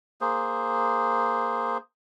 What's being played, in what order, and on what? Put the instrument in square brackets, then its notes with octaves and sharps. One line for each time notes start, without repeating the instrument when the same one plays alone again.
[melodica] A#3 G#4 C5